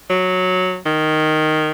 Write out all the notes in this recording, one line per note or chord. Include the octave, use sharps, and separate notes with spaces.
F#3
D#3